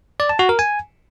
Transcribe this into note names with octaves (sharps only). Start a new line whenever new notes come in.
D5
A5
F#4
A#4
G#5